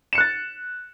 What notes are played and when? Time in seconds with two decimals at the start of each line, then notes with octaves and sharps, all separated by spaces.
0.13 E7
0.15 C#7
0.18 F#6
0.20 A6